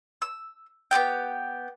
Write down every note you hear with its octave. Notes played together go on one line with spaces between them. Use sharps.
E6
B3 C4 G4 G5